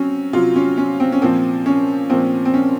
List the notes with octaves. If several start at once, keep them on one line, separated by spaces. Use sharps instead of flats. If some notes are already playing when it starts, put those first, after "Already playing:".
Already playing: F#3 C4 C#4
C3 F#3 F4
C#4
C#4
C4
C#4
A#2 F3 C4
C#4
A#2 F3 C4
C4
C#4